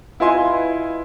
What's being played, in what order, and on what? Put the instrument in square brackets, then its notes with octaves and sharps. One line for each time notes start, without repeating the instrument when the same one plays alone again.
[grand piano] E4 F4 B4 D#5 G#5 C6